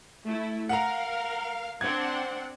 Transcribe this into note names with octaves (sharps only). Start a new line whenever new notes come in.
A3 E4
A#4 F5 F#5 A#5
C4 D4 F#5 G#6